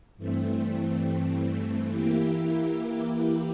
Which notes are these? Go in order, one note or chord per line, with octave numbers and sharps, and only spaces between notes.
G2 E3 A3 C4
E3 A#3 E4 G4